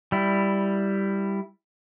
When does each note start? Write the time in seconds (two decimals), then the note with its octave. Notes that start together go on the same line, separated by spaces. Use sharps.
0.12 G3 E4